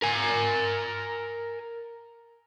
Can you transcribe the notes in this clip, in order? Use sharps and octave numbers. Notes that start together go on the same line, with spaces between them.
A#4 G#5